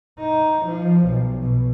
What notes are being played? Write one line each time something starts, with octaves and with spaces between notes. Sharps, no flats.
D#4
F3
B1
B2